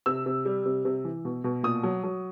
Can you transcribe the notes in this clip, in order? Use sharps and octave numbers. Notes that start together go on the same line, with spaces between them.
C3 E6
C3
G3
C3
C3
E3
B2
B2
A#2 D#6
F#3
F#3